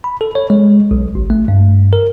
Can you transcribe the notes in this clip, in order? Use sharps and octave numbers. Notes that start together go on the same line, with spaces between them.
B5
A4
C#5
G#3
B1
G#1
A3
G2
A#4